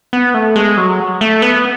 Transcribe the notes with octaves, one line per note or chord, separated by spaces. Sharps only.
B3
A3
G#3
F#3
A3
B3